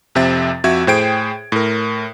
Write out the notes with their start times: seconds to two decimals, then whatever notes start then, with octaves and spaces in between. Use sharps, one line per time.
0.15 F2 C3 C4 E5 A6
0.64 F2 F#4 E5 G#6
0.87 A2 G#4 C5 G5 G#6 D7
1.52 A2 A#4